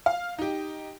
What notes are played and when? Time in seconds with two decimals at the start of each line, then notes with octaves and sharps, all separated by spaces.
0.06 F5
0.39 D#4 G4